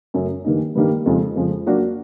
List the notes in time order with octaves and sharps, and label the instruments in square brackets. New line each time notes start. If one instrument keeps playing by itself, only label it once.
[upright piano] F#2 C#3 F#3 A3 C#4
G2 D#3 G3 A#3 D#4
G2 D#3 G3 A#3 D#4
F2 C#3 F3 G#3
F2 C#3 F3 G#3
F#3 A#3 D4 F#4